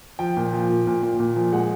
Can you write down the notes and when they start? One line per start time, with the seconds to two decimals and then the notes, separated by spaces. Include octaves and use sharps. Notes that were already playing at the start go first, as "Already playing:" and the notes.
0.19 F3 G5
0.37 A#2
0.53 F3
0.69 A#2
0.87 A#2
1.03 A#2
1.20 A#2
1.36 F3
1.53 G#3 F#5